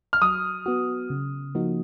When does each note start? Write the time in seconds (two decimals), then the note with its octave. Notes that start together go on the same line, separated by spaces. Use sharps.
0.13 F6
0.22 F#3 D#6
0.66 B3 F#4
1.10 C#3
1.55 F3 A#3 D#4 F#4